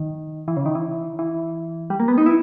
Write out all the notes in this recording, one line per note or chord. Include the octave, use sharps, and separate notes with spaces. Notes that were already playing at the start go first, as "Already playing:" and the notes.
Already playing: D#3
E3
C#3
D#3
E3
E3
G3
A#3
B3
D#4
E4